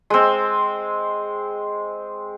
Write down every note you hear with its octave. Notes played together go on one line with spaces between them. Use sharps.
G#3 C4